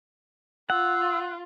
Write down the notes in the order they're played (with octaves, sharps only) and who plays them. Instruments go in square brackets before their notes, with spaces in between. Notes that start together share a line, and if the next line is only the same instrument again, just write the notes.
[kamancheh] F4 [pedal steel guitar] F#5 [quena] E6